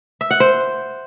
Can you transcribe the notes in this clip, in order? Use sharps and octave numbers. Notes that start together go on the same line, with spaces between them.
E5
F#5
C5